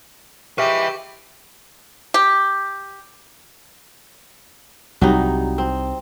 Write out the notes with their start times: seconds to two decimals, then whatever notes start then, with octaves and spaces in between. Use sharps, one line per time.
0.58 F3 G#3 E4 G4 B4 E5 C#6 D6
2.14 G4
5.01 C2 F#3 G3 D#4
5.58 C4